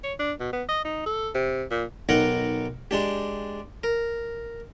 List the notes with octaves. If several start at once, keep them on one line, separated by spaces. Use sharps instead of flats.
C#5
D4
B2
B3
D#5
D#4
A4
C3
A#2
B1 D#4 A#4 F#5 G5
G#3 D4 G4
A#4